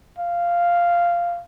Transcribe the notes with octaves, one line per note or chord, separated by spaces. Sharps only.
F5